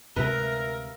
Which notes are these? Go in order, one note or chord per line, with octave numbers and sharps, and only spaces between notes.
D2 C3 G#3 A#4 B4 E5 F5